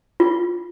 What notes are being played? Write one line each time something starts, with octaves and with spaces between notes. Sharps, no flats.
F4